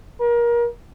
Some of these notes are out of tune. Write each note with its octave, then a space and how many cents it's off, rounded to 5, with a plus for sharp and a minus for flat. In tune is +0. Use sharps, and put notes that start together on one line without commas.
A#4 +30